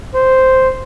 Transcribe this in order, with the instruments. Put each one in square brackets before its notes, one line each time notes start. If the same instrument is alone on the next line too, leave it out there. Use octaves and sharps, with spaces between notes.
[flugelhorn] C5